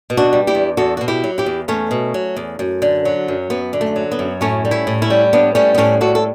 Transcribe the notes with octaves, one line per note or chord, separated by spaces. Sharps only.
B2
D4 F#4
G3
E4 G4
E2
E2 F#4 A4
B2 F#4
E4 G4
F#3
E4 G4
E2
E2 A3 C#4
B2
F#3
E2
F#2
D3
F#3
F#2
F#2 B3
D3
A3
F#3
B3
F#2
A2 A3 C#4
G3
C#4 E4
A2
C#4 E4
G3
A2 B3 D4
G3 A3 C#4
B3
A2 A3 C#4
G3 F#4 A4
A4